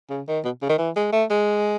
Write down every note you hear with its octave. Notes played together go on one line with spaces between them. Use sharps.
C#3
D#3
B2
C#3
D#3
E3
G#3
A3
G#3